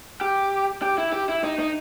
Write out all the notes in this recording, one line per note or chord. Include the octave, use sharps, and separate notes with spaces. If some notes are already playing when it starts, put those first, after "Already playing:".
G4
G4
E4
G4
E4
D#4
D#4